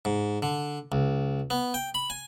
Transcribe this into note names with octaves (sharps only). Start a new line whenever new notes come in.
G#2
D3
C#2
B3
G5
B5
G#5